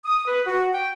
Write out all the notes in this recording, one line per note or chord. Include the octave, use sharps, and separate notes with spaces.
D#6
B4
F#4
G5